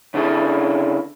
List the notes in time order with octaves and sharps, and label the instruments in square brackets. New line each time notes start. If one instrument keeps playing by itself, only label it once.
[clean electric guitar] C#3 D4 E4 G#4 A4